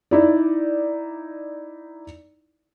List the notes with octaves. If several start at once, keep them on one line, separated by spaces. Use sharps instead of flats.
D#4 E4 D5